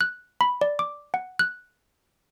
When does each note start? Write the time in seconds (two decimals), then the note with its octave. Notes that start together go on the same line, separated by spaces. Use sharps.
0.01 F#6
0.41 B5
0.61 D5
0.79 D6
1.14 F#5
1.39 F#6